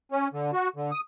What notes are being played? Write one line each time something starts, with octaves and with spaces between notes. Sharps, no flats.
C#4
D3
F#4
D3
D#6